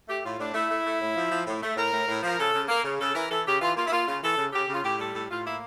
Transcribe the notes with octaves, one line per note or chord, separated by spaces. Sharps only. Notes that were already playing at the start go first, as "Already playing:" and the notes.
A3 G4
A2 F4
A2 D4
A3 E4
A3
A3
A2
F3
F3
A2
A3
A2 A#4
A2
A2
F3 A#4
C#3 A4
C#3
A#3
C#3
C#3 A4
E3 A#4
E3 A4
C#3 G4
E3 F4
A#3 F4
E4
A#3 F4
C#3 F4
E3 A4
C#3
C#3 G4
C#3 F4
A2 G4
G3 A4
A2 A4
A2 F4
A#3 E4